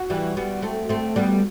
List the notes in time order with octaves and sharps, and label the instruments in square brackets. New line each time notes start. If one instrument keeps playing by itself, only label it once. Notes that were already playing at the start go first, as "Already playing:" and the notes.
Already playing: [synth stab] F#4
[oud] E3 G3
G3 B3
A3 C4
A3 C4
G3 B3